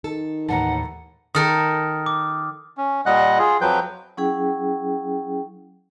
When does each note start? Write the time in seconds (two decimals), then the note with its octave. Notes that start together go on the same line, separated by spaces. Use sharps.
0.04 D#3 A4
0.49 D#2 A2 E3 F#5 A5 A#5
1.35 D#3 A4 A#4 D#6 F6
2.06 D6
2.77 C#4
3.06 A#2 G3 D#5 F#5 F#6
3.39 F4 G#4
3.61 F2 F3 F#3 B4 G5 G6
4.17 F#3 C#4 E4 G#4 G5